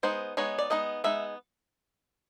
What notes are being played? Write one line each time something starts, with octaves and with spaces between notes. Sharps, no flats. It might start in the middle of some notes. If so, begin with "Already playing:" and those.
G#3 B3 D#4 C5
G#3 B3 D#4 C#5
D5
G#3 B3 D#4 D#5
G#3 B3 D#4 E5